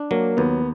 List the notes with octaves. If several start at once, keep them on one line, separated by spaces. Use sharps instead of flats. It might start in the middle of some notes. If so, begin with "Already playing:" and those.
Already playing: D4
F#3 A#3
D#2 B3